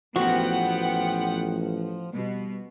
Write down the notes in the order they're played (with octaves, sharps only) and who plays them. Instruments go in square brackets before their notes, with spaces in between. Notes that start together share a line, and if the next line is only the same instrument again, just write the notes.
[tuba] A1 [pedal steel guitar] F3 [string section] B3 F#5 G5 [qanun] F#4
[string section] B2 [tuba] G3